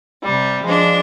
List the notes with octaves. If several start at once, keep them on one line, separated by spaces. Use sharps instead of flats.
C3 G3
F3 G#3 D4